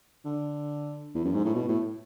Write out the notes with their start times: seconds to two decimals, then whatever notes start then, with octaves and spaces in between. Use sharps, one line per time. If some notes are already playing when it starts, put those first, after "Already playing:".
0.25 D3
1.15 E2
1.24 F#2
1.34 G#2
1.44 A2
1.54 B2
1.68 A2